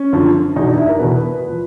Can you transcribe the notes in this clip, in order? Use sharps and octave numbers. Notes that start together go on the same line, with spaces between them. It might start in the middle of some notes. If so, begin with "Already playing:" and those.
Already playing: C#4
F#2 D3 F3
E2 B2 D#4
D4
E4
A#4
E2 B2 B4
F3